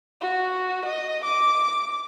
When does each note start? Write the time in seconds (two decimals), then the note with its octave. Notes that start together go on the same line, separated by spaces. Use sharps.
0.21 F#4
0.85 D#5
1.25 D6